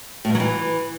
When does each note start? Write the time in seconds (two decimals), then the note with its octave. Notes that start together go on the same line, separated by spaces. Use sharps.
0.25 A2
0.30 G2
0.35 F#3
0.40 E3